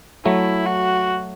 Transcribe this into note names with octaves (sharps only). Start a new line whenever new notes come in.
F#3 A3 E4
F#4